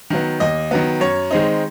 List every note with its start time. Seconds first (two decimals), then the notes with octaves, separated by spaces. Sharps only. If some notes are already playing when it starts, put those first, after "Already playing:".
0.10 D#3 F#3 B3
0.40 D#2 D#5
0.71 D#3 F#3 B3
1.00 F#2 C#5
1.31 D#3 G#3 C4 D#4